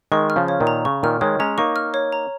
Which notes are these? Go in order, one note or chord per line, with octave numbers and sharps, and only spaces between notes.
D#3 G#3 C#6
F6
C#3 F3
C#5
A#2 D#3
A#5
C#3 C#6
A#2 D#3 F6
D#3 G#3 C#5
G#3 C#4 A#5
A#3 D#4 C#6
F6
C#5
A#5